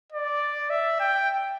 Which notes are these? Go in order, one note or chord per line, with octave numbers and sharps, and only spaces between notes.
D5
E5
G5